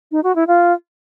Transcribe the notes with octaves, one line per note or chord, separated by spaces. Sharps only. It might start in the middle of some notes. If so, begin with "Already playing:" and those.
D#4
F#4
E4
F4